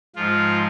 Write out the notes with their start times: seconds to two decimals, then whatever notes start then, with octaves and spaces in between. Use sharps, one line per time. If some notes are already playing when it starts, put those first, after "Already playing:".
0.16 G#2 F3 F4